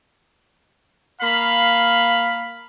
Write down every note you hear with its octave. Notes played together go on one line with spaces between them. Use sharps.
A#3 F5 B5